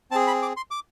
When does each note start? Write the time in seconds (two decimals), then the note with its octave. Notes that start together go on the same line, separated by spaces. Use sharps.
0.11 C4 G#4 A5
0.27 B5
0.42 D6
0.57 C6
0.71 D6